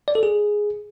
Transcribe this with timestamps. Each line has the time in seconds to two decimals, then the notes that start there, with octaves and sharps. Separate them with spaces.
0.08 D5
0.15 A4
0.23 G#4